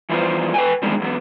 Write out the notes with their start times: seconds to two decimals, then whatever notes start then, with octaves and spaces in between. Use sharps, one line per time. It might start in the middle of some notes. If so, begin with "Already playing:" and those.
0.09 E3 F3 G3 B3 C5
0.54 B4 G5 G#5
0.82 E2 D#3 G3 G#3 C4
1.00 E2 F#3 B3